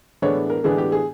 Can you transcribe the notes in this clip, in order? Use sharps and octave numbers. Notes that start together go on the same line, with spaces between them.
A2 E3 G#3 B3 D4 C#5
A#4
A2 E3 G#3 B3 D4 G#4
G4
G#4